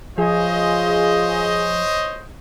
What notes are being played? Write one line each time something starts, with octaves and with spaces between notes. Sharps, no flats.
F3 F4 G#4 C5 C#5 D#5